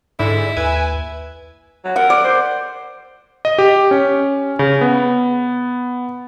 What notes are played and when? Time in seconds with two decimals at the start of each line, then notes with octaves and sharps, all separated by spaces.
0.19 G#2 D3 E4
0.57 D#2 B4 E5 G#5
1.84 F#3
1.96 A#4 F#5
2.10 D5
2.24 C5
3.45 D#5
3.58 G4
3.91 C#4
4.59 C#3
4.81 B3